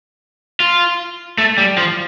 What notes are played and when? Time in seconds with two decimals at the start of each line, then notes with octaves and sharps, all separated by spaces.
0.60 F4
1.38 A3
1.58 G3
1.78 F3